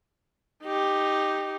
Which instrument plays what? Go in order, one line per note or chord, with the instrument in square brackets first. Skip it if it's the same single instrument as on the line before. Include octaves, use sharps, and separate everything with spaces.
[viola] D#4 G4